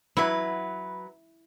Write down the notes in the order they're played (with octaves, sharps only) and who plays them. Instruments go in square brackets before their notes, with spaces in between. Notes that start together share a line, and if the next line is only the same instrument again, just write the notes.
[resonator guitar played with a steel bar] F#3 B4 [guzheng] E4